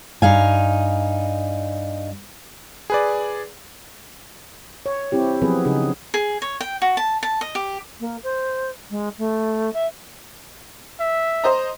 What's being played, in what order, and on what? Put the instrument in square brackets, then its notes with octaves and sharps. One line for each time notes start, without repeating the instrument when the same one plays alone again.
[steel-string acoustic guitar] G2 D#4 F5 G#5
[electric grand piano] G#4 B4 D5
[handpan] C#5
C4 E4 G4
F3 F#3 B3 C4 G#4 B4
C#3 D#4 G#4
[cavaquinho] G#4
C#5
G5
F#4
A5
A5
D#5
G4
[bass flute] A#3
C5
G#3
A3
E5
[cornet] E5
[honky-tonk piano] C5 D#5 A#5